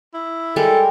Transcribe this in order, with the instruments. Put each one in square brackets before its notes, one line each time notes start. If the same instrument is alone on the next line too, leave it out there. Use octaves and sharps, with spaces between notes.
[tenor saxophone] E4
[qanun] G3 G#3 [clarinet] A4 [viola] A#4